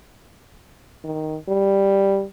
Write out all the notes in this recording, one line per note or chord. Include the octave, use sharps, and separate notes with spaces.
D#3
G3